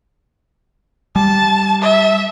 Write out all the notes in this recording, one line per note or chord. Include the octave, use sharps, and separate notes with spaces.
G3 A5
E5